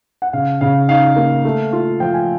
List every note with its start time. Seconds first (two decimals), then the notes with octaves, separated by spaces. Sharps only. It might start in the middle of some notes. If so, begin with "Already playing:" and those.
0.22 F#5
0.33 C#3 F5
0.61 C#3 F5
0.88 D#4 F5
1.16 A#3
1.45 A3
1.72 F4
2.00 F3 G5
2.14 G#5